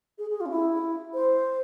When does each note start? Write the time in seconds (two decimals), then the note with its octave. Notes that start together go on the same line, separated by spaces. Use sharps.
0.18 G#4
0.30 G#4
0.40 F4
0.46 C#4
0.51 E4
1.14 C5